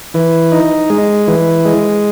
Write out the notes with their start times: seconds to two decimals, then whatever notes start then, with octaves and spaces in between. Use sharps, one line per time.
0.14 E3
0.52 D#4
0.90 G#3
1.28 E3
1.65 G#3